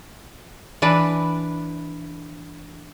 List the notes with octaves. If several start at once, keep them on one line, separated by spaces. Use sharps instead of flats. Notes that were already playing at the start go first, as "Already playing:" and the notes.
E3 D4 B4